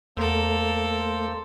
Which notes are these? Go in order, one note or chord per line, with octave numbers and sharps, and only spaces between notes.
E2 A3 A#3 A4 A#4 C5 E6